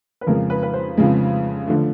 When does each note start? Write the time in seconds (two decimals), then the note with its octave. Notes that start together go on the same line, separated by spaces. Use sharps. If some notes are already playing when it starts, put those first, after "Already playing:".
0.21 B4
0.27 F2 C#3 F3 G#3 A#4
0.50 B4
0.63 B4
0.74 C5
0.97 F2 C#3 F3 G#3
1.67 D3 F3 A3